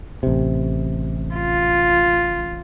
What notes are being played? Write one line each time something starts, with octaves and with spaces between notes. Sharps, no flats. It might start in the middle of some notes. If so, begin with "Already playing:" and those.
A1 C3
F4